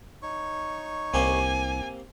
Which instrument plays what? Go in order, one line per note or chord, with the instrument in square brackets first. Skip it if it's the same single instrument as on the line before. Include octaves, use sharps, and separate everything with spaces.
[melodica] D#4 C#5 C#6
[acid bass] C2 [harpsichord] A#3 C4 G4 [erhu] G#5